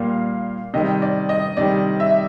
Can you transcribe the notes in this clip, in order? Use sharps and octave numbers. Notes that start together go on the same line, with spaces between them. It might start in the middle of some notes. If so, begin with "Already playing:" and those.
Already playing: A#2 G3 A#3 F5
C3 D#3 G3 D#5
D5
D#5
C3 D#3 G3 D5
E5